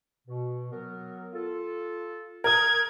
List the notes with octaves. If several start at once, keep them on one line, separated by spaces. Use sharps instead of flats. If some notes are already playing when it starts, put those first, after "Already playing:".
B2
F#3 B3 A#4
F4 A4
A#4 D#6 G#6